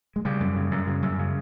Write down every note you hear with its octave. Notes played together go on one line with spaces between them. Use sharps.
G#3
C#3 G3
F#2
C#3
F#2
C#3
F#2
C#3